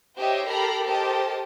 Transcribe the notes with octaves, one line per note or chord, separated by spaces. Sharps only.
D#4 G4 C5 C#5 D#5 E5
G4 A4 A#4 A#5 B5 C7
G4 A4 A#4 C5 D#5 A5